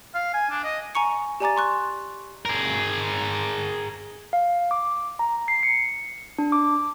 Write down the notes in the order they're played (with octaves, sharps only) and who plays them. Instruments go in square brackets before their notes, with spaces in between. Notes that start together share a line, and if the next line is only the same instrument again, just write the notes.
[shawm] F5
G#5
D4
D#5
[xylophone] G#5 A#5 C#6 C#7
G4 D5 G#5 A#5 D6 A6
C6 C#6 F#6
[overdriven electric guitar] G#4 A#4
[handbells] F5
D6
A#5
C7
C#7
D4
D6